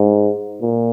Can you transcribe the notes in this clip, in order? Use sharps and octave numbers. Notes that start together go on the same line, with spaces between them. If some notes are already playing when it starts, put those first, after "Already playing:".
Already playing: G#2
A#2